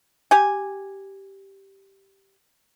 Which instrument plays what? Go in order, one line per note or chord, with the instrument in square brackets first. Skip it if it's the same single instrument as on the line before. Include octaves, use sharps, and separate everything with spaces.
[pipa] G4 G#5